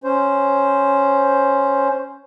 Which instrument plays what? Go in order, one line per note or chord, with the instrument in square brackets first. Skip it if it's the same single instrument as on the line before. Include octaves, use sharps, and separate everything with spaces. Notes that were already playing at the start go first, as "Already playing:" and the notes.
[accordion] C#4 C5